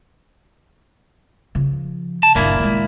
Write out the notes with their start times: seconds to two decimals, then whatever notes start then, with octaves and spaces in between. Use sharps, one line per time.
1.55 C#3 F3
2.23 A5
2.35 F#1 A#2 A#3 D4 E4
2.60 D#3 G#3